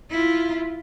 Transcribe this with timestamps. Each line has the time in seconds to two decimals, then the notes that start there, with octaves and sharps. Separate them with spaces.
0.10 E4 F4